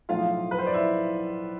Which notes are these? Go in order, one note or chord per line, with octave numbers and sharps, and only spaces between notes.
B1 A2 F3 F4 F5
B4
C5
D5
E4 E5